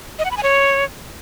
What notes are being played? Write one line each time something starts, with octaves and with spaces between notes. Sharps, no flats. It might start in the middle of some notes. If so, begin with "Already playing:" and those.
D#5
F#5
B5
G#5
C#5